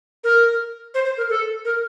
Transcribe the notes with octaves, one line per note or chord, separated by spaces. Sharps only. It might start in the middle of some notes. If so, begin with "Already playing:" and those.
A#4
C5
C5
A#4
A4
A#4